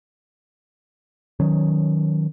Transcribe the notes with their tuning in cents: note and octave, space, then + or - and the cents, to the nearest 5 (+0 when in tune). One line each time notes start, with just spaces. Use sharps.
D#3 +0 F#3 -15 C#4 +0